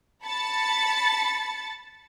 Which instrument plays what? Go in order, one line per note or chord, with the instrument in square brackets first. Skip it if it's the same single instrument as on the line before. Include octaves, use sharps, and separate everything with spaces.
[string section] A5 B5 A6 C#7